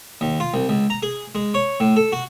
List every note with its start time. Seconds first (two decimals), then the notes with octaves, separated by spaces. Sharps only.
0.21 D#2
0.40 F4
0.54 C2
0.69 C#2
0.90 A#5
1.03 G#4
1.35 G#3
1.54 C#5
1.80 A2
1.96 A4
2.12 F#4